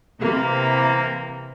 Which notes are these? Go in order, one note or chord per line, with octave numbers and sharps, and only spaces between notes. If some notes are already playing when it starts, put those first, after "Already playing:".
C3 E3 A#3